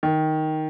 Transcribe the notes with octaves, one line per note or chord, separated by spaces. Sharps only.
D#3